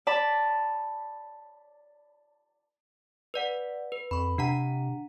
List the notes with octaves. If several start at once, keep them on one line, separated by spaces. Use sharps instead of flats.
D5 A5 B5
B4 D5 F#5
B4
F2 B5 C#6
C3 D4 F#5 A#5